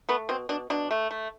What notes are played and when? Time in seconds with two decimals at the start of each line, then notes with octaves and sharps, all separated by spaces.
0.09 A3 B3
0.29 B2 C4
0.49 B2 D4
0.70 B2 D4
0.91 A3
1.11 A3